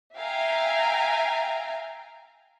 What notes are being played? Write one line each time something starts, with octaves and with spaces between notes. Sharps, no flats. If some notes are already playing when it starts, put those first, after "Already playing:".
E5 F5 G5 G#5 A#5